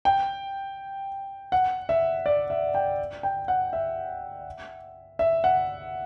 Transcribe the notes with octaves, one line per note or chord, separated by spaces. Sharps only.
G5
F#5
E5
D5
E5
G5
G5
F#5
E5
E5
F#5